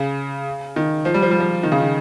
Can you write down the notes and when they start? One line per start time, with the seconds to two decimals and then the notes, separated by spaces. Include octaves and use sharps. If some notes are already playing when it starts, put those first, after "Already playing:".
Already playing: C#3
0.76 D#3
1.05 F3
1.14 G3
1.22 F3
1.31 G3
1.40 F3
1.63 D#3
1.72 C#3
1.80 D#3